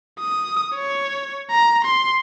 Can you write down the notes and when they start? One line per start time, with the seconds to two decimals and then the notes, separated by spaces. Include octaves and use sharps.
0.20 D#6
0.74 C#5
1.51 A#5
1.85 C6